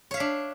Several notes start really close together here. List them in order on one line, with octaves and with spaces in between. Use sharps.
C#5 F5 E5 D4